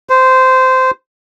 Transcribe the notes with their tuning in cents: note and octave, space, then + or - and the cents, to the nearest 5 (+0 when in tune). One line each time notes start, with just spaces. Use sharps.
C5 -15